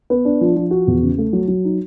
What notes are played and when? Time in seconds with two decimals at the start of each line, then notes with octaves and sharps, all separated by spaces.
0.10 B3
0.25 D4
0.41 F3
0.56 F3
0.71 F#4
0.87 E2
1.02 C#3
1.18 A3
1.33 F#3
1.48 F#3
1.65 D#4